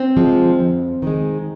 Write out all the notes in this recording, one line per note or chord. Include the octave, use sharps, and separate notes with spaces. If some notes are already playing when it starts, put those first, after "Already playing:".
Already playing: C4
D3 F3 G#3
F2
D#3 G#3